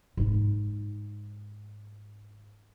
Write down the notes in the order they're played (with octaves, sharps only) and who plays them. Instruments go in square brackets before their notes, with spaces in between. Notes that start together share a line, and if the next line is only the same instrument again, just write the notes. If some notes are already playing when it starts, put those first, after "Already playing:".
[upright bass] G#2 D#4